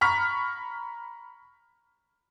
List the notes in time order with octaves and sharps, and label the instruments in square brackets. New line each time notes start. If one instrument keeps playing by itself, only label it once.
[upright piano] A#5 B5 C#6 F6 B6